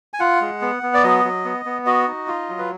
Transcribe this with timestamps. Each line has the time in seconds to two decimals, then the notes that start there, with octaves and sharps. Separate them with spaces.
0.14 G#5
0.20 F4 F#5
0.41 G#3
0.62 B3
0.83 B3
0.94 D5
1.03 F#3 D#5
1.24 F#3
1.45 B3
1.65 B3
1.86 F#4 D#5
2.07 D#4
2.28 F4
2.49 F#3
2.58 B4